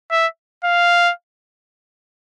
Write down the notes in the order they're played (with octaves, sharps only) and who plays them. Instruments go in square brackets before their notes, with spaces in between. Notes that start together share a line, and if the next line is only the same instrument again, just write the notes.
[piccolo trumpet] E5
F5